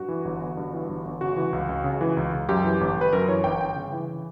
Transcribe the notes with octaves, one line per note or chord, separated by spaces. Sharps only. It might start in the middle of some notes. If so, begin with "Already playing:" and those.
Already playing: G2 F#4
E3
G1
G1
G2
E3
G1
G1
C#3 F#4
E3
C#2
C#2
C#3
E3
C#2
C#2
F#2 G4
E3
G1
G1 B4
F#2 A#4
E3 C#5
G1 G5
G1 G5
C#3
E3